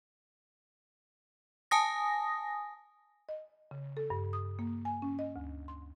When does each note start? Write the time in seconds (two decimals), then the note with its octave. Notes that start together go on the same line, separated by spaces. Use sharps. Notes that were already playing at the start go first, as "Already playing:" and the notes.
1.71 G#5 A5 D#6 A#6
3.29 D#5
3.71 C#3
3.97 A4
4.10 G2
4.33 D#6
4.59 A#3
4.85 G#5
5.02 C#4
5.19 D#5
5.36 D2
5.68 C6